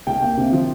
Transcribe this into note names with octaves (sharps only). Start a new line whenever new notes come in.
C2 G5
A#3
C3
F3